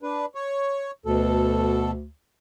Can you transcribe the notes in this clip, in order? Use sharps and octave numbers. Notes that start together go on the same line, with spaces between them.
D4 B4
C#5
D2 B2 A4